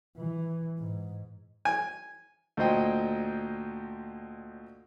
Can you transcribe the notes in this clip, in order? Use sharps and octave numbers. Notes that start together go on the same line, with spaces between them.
E3
G#2
G#5
D2 A#2 C5 D#5 G5